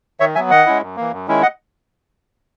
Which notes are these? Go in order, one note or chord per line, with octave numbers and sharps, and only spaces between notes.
D#3 C#5 E5
F#3 B3 E5 G#5
D#3 D#5 F#5
G#3 C#4 E4
F#2
E3 A#3
F#2
D#3 G#3 C#4 E4
D#5 F#5